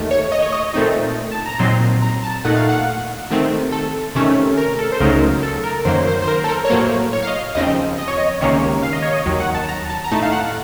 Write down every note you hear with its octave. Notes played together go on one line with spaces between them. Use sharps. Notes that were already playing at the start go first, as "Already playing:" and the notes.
Already playing: D#2 D#3 A3
C#5
D#5
C#5
D#5
A#2 A3 C4 D#4
A5
A#5
A#2 F#3 C4 D#4 C6
A#5
A5
A#2 A3 D#4 F#5
F5
F#5
C3 D#3 A3 C4
A4
C3 D#3 A3 C#4
A#4
A4
C5
C#2 C#3 F#3 A3 D#4 A#4
A4
A#4
F#2 D#3 F#3 A#3 C5
C5
C5
A#4
A4
A#4
C#5
A2 F#3 A#3 C5
C#5
F5
D#5
D#2 C#3 F3 C4 D#5
D#5
C#5
D#5
C#2 C3 D#3 A#3 C#4 C#5
F5
D#5
C#5
D#5
D#2 D#3 F#3
F#5
A5
A#5
A5
A#5
A2 A3 D#4 A5
F5
F#5